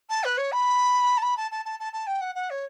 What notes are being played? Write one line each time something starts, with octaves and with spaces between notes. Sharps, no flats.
A5
B4
C#5
B5
A5
B5
A5
A5
A5
A5
A5
G5
F#5
F#5
C#5